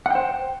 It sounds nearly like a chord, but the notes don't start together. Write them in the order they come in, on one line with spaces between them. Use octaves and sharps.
F#5 G5 C5